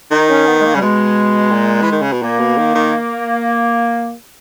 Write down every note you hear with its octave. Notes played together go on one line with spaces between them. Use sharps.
D#3 D#4
C#4
B3
G#3
A#3
C#3 G3
B2 G#3
A#2
E3
D#3
C#3
B2
A#2 A#3
B2
D#3
D#3